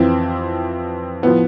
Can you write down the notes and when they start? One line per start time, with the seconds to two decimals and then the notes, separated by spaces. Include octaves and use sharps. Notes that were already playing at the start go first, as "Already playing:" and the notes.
Already playing: F2 E3 C4
1.23 A2 F3 B3